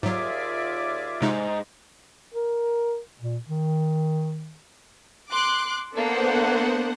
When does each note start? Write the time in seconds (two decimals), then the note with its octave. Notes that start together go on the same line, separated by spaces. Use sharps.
0.03 D#2 G#2 F#3 F4 G#4 D5 E5 D6
1.22 G#2 C3 G#3 D#4
2.34 A#4
3.21 A#2
3.48 D#3
5.30 C6 D6 F#6
5.94 A#3 B3 D4 A4 C5 F#5